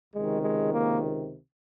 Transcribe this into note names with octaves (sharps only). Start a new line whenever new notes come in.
C#2 C3 D#3 G#3
G#3
A#3